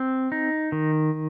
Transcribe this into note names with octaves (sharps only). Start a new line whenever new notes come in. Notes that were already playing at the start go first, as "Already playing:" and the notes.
Already playing: C4
D#4
D#3